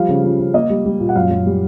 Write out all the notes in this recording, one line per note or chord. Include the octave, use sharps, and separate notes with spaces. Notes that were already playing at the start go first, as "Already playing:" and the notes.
Already playing: F3 G3 F5
C#3
F3
C#3
A#3 D#5
G3
G3
A#2
F#5
F#2 F5
F#2
G3